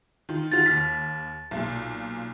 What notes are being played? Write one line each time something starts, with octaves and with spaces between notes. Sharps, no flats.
D#3 F4
D#3 F4 F#4 A6
D#2 F6 B6
B1 A#2